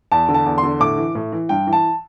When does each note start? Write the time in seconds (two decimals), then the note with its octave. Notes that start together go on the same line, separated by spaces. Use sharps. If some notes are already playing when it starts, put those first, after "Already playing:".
0.12 E2 A5
0.29 D3
0.34 A5
0.46 E2
0.58 C6
0.63 D3
0.80 A2 D6
0.97 E3
1.15 A2
1.32 E3
1.49 G2 G5
1.67 E3
1.73 A5